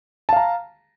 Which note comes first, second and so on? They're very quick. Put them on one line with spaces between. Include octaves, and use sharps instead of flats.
A5 F5 A#5